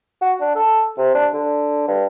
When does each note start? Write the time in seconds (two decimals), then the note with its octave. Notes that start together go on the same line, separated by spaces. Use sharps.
0.21 F#4
0.41 D4
0.55 A4
0.97 C3
1.14 D4
1.33 D3
1.88 G2